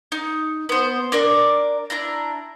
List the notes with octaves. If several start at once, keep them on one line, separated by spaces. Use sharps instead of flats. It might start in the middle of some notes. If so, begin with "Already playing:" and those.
D#4
B3 C5
D4 A#4 D5
D4 E4 A#5